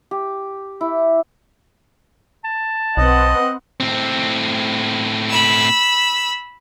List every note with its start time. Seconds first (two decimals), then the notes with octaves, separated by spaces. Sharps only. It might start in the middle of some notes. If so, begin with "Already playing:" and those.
0.11 G4
0.81 E4
2.44 A5
2.97 B1 C4 B4 D#5 F#5
3.80 A2 C4
5.29 B5 E6